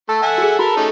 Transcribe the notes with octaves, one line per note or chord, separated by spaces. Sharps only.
A3 A4
E5 F#5 G#5
F#4 G#4
F#4 A#4 B5
A3 C#4 D#4